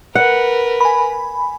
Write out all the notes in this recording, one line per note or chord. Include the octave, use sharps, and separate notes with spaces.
A#4 B4 F#5
G#5 B5